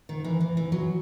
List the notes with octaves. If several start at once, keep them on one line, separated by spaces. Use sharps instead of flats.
D#3
E3
E3
E3
F#3